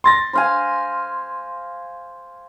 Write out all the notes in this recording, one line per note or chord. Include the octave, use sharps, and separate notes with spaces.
C6 A6 A#6
C5 F5 G#5